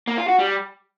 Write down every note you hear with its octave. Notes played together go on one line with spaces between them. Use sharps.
A#3
F4
F#4
G3